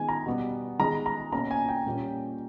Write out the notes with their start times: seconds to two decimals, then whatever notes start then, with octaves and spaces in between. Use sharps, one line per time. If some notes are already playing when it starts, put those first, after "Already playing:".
Already playing: D#3 G#3 B3 G#5
0.09 A#5
0.26 B2 G3 B3
0.79 D#3 G#3 B3 A#5
1.06 A#5
1.32 B2 A#3 C#4 A#5
1.51 G#5
1.68 G5
1.86 A#2 G3 A#3 C#4